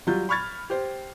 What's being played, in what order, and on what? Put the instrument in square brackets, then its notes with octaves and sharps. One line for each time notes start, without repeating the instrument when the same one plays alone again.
[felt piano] F#3 G3 F4 G6
B5 C#6 F6 G#6 A6
G4 C5